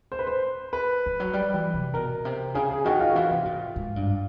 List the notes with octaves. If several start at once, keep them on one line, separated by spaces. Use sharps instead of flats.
C5
B4
C5
B4
F3
F#3
G3
E3
C3
B2 A#4
C3
C#3 G#4
G#4
D#3 F#4
F4
F#4
E3 F4
C3
A#2
G#2
G2